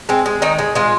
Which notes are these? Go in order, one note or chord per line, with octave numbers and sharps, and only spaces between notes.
G#3 C4
G#3
D#3 D#4
G#3
G#3 F4